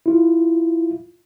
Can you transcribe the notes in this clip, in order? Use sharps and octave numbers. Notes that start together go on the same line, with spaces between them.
E4 F4